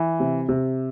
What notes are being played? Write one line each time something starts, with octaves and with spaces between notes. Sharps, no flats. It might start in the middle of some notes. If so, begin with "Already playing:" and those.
Already playing: E3
C3
C3